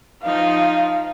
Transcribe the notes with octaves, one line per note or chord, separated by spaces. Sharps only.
F3 D#4 F5